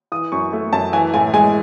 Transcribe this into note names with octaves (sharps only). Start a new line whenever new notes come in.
E3 D#6
F#2 C#6
A3
F#2 A5
E3 G#5
A2 G#5
G#3 G#5